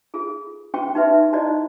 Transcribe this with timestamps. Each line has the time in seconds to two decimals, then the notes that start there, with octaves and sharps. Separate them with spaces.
0.14 F4 G#4 A4
0.74 C#4 F4 F#4 C5 G5 C#6
0.95 D#4 F#4 B4 E5 C6
1.33 D#4 E4 F#4 C5 D5 D#5